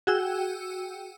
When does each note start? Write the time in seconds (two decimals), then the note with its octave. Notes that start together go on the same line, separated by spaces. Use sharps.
0.07 F#4 G#4 G5 E6